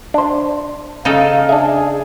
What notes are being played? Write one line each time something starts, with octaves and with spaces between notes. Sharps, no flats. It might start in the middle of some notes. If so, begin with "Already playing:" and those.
D4 C5
C#3 D#4 A4 F5
D4 G#4 E5